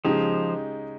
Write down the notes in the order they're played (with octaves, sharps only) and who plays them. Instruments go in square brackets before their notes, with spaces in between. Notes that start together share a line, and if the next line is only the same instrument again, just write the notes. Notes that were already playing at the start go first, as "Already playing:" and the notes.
[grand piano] C#3 G#3 D#4 G4 [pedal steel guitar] F3